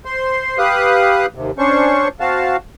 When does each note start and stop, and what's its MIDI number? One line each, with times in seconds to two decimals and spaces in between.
0.05 0.58 72
0.05 0.58 84
0.58 1.26 67
0.58 1.26 71
0.58 1.26 77
0.58 1.26 87
0.58 1.26 90
1.35 1.51 39
1.35 1.51 48
1.58 2.08 61
1.58 2.08 62
1.58 2.08 72
1.58 2.08 85
2.20 2.57 60
2.20 2.57 66
2.20 2.57 77
2.20 2.57 81